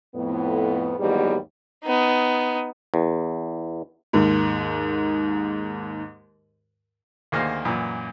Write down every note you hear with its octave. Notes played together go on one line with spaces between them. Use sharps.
F2 A2 B3
D#2 G#2 E3 F#3 G3 B3
B3 D#4
E2
D#2 G#2
D2 D#3 A#3 G#4 C5 F5
F#2 A#2 E3